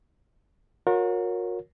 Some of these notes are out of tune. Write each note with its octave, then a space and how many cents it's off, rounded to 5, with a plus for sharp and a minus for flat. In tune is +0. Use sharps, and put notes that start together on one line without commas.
F#4 -40 A#4 +0 C#5 +0